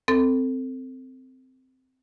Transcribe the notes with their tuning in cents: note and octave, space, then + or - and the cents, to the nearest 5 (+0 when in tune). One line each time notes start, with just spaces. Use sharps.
C4 -15 A4 +20